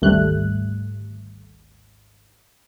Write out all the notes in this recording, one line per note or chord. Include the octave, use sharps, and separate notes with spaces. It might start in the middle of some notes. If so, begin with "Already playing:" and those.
G#1 D2 G3 A3 F#6